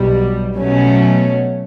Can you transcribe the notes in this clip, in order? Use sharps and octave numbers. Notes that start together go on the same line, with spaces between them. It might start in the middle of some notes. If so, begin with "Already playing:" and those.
Already playing: B1 B2 G3
B2 F#3 A3 C#4